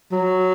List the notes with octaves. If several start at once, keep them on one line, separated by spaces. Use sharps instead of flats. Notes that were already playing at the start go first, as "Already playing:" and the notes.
F#3